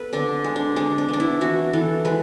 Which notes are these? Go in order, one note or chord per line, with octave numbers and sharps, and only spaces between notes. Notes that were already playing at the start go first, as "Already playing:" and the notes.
Already playing: B3 A4 B4
D3 D4
G#3
D4
G#3 D4
D4
B3 D4
E4
E3 F#4
E3 A4
G#3 B4